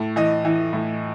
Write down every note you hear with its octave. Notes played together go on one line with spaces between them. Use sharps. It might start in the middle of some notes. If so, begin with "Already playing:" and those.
Already playing: A2
E3 D#5
E3
A2